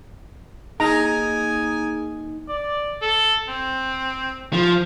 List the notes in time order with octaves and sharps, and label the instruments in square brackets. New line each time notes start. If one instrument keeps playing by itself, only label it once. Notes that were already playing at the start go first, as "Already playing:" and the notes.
[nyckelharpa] A#3 G#5 [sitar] D#4 [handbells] G#4 [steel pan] A#5
[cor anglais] D5
A4
C4
[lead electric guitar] F3